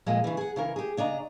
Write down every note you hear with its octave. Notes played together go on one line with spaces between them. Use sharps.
F2 A#2 G#3 A#3
C#3 E3
G#4 F#5
C#3 E3 A#4
G4 G#4
C#3 D4 D#5 A#5